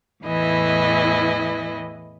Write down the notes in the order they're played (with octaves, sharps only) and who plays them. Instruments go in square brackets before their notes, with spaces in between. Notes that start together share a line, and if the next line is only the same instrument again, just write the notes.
[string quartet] E2 A2 E3 E4 D#5